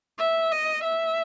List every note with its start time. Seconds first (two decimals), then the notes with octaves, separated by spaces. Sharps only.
0.19 E5
0.52 D#5
0.84 E5